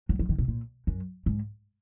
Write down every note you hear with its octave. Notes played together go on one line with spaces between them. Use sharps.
F#3
F3
D#3
B2
A#2
F#2
G#2